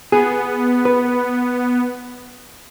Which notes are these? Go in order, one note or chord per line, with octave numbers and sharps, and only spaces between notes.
B3 G#4
B4